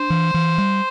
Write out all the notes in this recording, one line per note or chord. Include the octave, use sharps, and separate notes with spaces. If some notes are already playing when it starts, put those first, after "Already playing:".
Already playing: D4 C5
E3
E3
G3